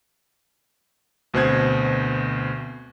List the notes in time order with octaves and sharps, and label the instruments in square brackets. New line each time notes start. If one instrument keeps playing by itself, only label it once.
[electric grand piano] D2 B2 C4 C5 F#6 G#6